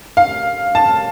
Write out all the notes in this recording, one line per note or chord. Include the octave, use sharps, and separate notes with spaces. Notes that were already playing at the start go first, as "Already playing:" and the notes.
F5
A5